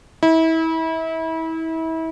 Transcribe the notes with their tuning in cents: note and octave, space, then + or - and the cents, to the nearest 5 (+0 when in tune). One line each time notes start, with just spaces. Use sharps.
E4 -30